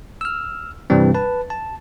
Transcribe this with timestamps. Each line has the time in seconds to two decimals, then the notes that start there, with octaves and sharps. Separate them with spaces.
0.21 E6 F6
0.90 G2 C3 E3 G3 C4
1.15 B4 A5
1.50 A5